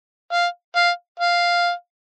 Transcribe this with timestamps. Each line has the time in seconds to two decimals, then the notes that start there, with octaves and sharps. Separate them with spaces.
0.33 F5
0.76 F5
1.20 F5